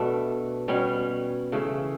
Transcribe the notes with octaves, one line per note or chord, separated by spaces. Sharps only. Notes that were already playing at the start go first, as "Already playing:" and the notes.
Already playing: B2 A3 D4
B2 G3 C#4
C#3 E3 A3